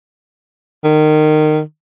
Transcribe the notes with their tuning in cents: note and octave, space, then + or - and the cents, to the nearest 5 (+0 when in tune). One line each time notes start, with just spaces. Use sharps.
D#3 -20